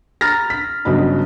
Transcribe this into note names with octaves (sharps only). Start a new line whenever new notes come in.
A#5 B5 F6 A6 A#6
B6
G1 C#3 F#3 D4 D#5 B5